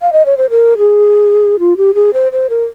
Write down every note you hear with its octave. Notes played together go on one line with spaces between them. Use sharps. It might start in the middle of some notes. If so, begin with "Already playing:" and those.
F5
D#5
C#5
C5
A#4
G#4
F4
G4
G#4
C5
C5
A#4